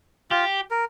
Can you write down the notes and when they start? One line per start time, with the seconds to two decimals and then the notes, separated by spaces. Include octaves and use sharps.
0.31 F4 G4
0.71 A#4